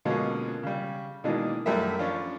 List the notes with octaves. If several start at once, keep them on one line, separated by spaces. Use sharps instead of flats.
B2 D3 F3 G#3 A#3 C#4
C#3 G3
B2 D#3 E3 G#3 A#3 D4
F#2 F3 G3 A3 A#4 E5
F3 C#4 D4 F4